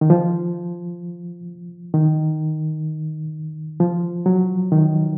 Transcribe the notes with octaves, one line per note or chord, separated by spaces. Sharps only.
D#3
F3
D#3
F3
F#3
D#3